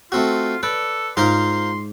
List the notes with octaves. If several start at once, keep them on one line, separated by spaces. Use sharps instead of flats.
A3 C4 F4 F#4
A4 B4 D5
G#2 F4 A#4 C5 C6